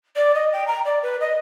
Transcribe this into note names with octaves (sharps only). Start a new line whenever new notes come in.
D5
D#5
G5
A#5
D5
B4
D#5